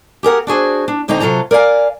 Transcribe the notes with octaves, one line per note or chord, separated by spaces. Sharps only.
G4 G#4 A#4 F#5
D4 F#4 G#4 C5
D4
D2 D3 C4 D#4 D#5 A#5
C3 F#3 F4 A4 A#5
A#4 D5 D#5 F5 G#5